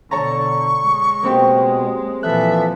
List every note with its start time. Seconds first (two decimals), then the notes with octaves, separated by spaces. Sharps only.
0.11 B2 D3 C#5 A5 A#5 C#6
0.82 G#3
1.23 B2 A#3 C4 G4
2.23 A#2 E3 F3 A4 E5 F#6